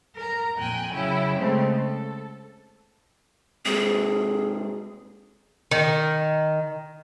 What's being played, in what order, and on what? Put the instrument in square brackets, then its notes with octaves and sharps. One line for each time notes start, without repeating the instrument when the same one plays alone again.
[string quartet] A#4 A#5
F2 A#2 G5 G#5 F#6
C#3 F#3 C#4 E4 G5
C#3 G#3 A3 C4
A4
[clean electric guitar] G#2 C3 [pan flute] G#4
[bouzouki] D#3